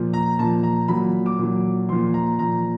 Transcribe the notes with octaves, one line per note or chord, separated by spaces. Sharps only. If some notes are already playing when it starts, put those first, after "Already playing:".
Already playing: A#2 F3
A#5
A#2 F3 A5
A#5
A#2 F#3 B5
D6
A#2 F#3
A#2 F3 C6
A#5
A#2 F3 A#5